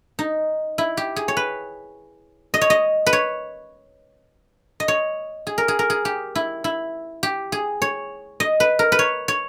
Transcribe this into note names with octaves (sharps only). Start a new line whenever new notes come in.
D#4
E4
G4
G#4
C#5
B4
D#5
C#5
D#5
B4
C#5
D#5
C#5
G#4
A#4
G#4
A#4
G#4
G4
E4
E4
G4
G#4
C#5
D#5
B4
A#4
B4
C#5
C#5